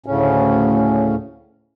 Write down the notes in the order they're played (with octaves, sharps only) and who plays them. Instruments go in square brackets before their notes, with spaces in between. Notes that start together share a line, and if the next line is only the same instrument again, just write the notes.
[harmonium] D2 A2 C#3 C#4